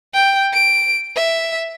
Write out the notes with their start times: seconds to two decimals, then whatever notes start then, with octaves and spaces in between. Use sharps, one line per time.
0.14 G5
0.53 D7
1.16 E5